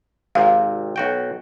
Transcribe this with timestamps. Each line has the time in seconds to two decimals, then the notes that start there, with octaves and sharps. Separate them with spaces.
0.35 G#1 C3 F5
0.96 B1 F#4 G5